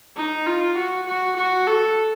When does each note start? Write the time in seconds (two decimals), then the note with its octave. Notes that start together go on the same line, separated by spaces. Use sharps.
0.16 D#4
0.46 F4
0.77 F#4
1.07 F#4
1.36 F#4
1.67 A4